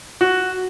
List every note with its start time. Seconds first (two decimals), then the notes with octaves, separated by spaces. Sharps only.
0.21 F#4